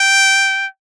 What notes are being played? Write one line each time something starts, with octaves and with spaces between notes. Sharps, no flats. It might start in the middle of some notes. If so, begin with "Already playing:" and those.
Already playing: G5